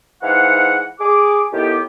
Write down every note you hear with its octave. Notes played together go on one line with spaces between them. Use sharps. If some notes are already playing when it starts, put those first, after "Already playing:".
G#2 E3 F5 F#5
G#4 D6
A2 D#3 B3 G4